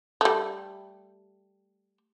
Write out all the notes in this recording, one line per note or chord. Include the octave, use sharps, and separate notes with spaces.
G3 A3